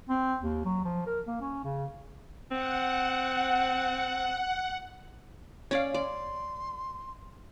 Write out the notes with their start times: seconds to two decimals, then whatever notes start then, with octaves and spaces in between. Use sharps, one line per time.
0.09 C4
0.43 D#2
0.65 F#3
0.85 F3
1.07 A#4
1.27 A#3
1.41 C#4
1.64 C#3
2.51 C4 F#5
5.71 C#4 C#5 D5 F5
5.94 D5 C6